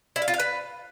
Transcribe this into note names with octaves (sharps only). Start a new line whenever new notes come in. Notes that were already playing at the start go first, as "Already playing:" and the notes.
E4
F5
F4
F5
B4